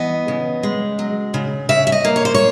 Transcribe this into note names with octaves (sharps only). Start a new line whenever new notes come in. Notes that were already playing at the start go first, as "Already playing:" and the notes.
Already playing: E3 B3 D#5
C#3
G#3
F#3
C#3
C#3 E5
E5
D#5
A#3
C#5
C5
C#5